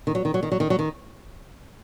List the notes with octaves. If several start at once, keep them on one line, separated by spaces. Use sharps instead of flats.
D#3
F#3
D#3
F#3
D#3
F#3
D#3
F#3
D#3